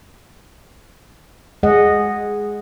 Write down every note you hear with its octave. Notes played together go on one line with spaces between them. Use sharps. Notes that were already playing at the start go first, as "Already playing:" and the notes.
G#3 G#4 D#5 F#5